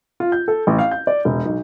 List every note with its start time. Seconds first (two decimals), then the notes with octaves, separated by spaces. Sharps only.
0.20 F4
0.32 G6
0.48 A4
0.67 A1
0.79 F5
0.91 G6
1.07 D5
1.25 E1
1.45 B1